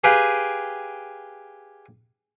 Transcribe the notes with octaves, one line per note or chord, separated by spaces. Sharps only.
G4 G#4 B4 F5 G5 G#5